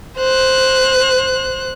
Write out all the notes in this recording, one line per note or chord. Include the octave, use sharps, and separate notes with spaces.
C5 F#6